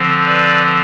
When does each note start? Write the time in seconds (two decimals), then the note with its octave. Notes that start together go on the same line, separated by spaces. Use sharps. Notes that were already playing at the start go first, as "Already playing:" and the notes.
Already playing: D3 F3 C4
0.25 B4 D5